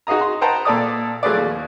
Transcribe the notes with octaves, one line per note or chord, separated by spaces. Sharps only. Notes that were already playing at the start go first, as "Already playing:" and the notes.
D#4 F#4 G#4 D#5 A#5
C6
B4 C5 F#5 G5 A5 A#5
A#2 A4 D5 D#6
F3 F#3 A3 G#4 B4 D5
D#2